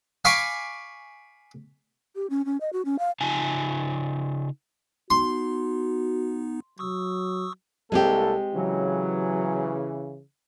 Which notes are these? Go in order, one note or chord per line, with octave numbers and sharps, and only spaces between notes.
F5 G#5 B5 C#6 D6
G4
C#4
C#4
D#5
F#4
C#4
F5
C#3 D#4 F4 G#5 A5
B3 D#4 F#4 C6
F#3 C#6 D#6 E6
C2 G#3 A#3 C4 G4 A4
C#3 E3 F#3